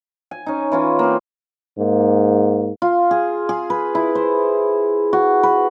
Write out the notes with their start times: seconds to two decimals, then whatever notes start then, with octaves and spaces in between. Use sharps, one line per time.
0.31 G#5
0.46 C#4 D#4
0.72 E3 C#4 F4
0.99 A#3 C4
1.78 G#2 A#3
2.82 F4
3.11 G#4
3.49 G#4
3.70 B4
3.95 E4
4.15 C5
5.13 F#4
5.43 B4